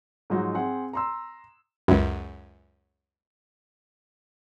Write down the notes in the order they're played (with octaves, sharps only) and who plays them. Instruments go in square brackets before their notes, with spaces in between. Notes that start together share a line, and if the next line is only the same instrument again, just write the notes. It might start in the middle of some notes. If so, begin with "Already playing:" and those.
[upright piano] G#2 F3 F#3 G#3 D#4 F#4
C4 G#4 F#5
A#5 C6 E6
[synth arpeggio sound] C#2 F#2